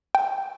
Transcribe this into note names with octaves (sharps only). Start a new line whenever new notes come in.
G5